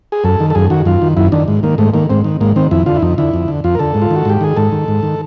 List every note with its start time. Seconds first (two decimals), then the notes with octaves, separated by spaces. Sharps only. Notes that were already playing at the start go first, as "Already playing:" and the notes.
0.12 G#4
0.24 F#2 A4
0.40 D#3
0.50 A4
0.55 F#2 G#4
0.70 D#3 F#4
0.85 F#2 F4
1.02 D#3
1.17 F#2 E4
1.32 D#3 D4
1.48 G#2
1.63 D#3 A#3
1.78 G#2 A3
1.94 D#3 A#3
2.10 G#2 C4
2.24 D#3
2.41 G#2 A#3
2.56 D#3 C4
2.71 F2 E4
2.86 D3 F4
2.96 E4
3.02 F2 D#4
3.18 D3 E4
3.34 F2
3.48 D3
3.64 F2 F4
3.75 A#4
3.79 D3 A4
3.94 G#2
4.02 F4
4.10 D#3
4.16 F#4
4.25 G#2 G4
4.41 D#3 G#4
4.56 G#2 A4
4.72 D#3
4.88 G#2
5.03 D#3